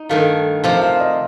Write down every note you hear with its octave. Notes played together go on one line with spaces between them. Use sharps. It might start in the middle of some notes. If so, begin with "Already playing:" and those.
Already playing: D#4
G2 D#3 A3 F5
C3 F3 C4 F5
F5
D#5